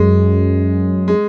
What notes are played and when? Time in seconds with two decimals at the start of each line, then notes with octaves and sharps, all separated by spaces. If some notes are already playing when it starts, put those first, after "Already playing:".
Already playing: F#2 G#3
1.08 G#3